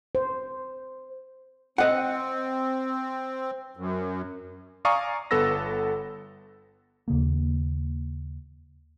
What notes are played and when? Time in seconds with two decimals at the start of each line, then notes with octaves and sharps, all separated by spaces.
0.15 C5
1.78 C4 D#5 F#5
3.77 F#2
4.85 D5 F5 G#5 A#5 C#6 D#6
5.31 G1 B3 A4 B4 E6 A#6
7.08 D#2 C#3 A#3